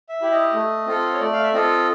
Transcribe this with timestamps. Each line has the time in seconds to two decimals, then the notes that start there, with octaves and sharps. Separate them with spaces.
0.09 E5
0.21 E4 G4
0.32 D#5
0.53 A3
0.87 C4 F4 A4
1.13 C#5
1.20 A3 D5
1.33 F5
1.43 E5
1.53 C4 F4 A4 D#5